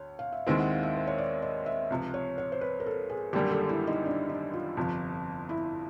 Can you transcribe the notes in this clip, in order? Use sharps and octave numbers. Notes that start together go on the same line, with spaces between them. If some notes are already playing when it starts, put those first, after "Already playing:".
Already playing: D2 C#5
F5
E5
D#2 D#3 G#3 C4 E4 D#5
F#5
F5
E5
C5
C#5
D5
D#5
E5
C#2 C3 F3
C#5
C#5
C5
B4
A#4
A4
G#4
G#1 F#2 D3 G3 A#3 G4
A4
E4
D#4
D4
D#4
F4
G1 F2 C3 F3
E4